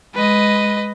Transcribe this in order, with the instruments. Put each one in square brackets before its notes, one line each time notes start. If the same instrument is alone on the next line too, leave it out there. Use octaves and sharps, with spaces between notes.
[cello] G#3 [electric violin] B4 D#5